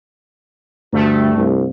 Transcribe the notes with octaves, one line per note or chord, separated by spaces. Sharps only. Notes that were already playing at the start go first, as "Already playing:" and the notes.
D2 G2 A3
C2